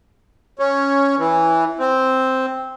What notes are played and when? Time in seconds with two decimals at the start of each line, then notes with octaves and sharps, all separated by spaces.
0.59 C#4
1.19 E3
1.79 C4